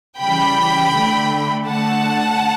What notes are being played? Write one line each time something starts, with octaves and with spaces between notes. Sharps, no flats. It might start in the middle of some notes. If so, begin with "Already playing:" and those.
C#3 E3 G3 G5 B5
D3 A3
D3 A3 F#5 A5